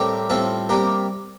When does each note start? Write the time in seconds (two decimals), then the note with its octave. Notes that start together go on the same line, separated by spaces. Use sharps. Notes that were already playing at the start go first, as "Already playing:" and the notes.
Already playing: A2 G3 C4 G4 A#4
0.30 A2 G3 C4 F4 A4
0.69 C3 G3 A#3 G4 A#4